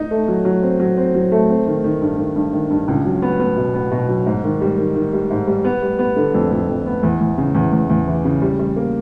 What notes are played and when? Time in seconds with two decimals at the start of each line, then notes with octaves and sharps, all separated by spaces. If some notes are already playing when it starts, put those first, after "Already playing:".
Already playing: D#4
0.11 A3
0.28 F#3
0.45 F#3
0.62 C4
0.80 F#3
0.97 C4
1.14 F#3
1.32 A3
1.49 C4
1.66 D#3
1.84 D#3
2.01 G2
2.18 D#3
2.36 G2
2.53 D#3
2.70 G2
2.88 C#2
3.05 F#3
3.22 B3
3.40 B3
3.57 B2
3.74 B3
3.91 B2
4.09 F#3
4.26 G#2
4.44 D#3
4.61 G3
4.78 D#3
4.96 D#3
5.13 G3
5.30 G#2
5.47 G3
5.65 B3
5.82 G3
5.99 B3
6.16 D3
6.34 F2
6.51 F2
6.69 F2
6.86 B3
7.03 E2
7.21 E2
7.38 C#3
7.55 E2
7.73 E2
7.90 E2
8.08 E3
8.25 C#3
8.42 G3
8.59 G3
8.76 A#3